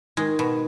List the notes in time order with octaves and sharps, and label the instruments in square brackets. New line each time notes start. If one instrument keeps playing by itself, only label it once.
[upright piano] D#3 [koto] G#3
[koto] B2